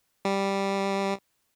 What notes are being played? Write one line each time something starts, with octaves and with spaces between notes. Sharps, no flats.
G3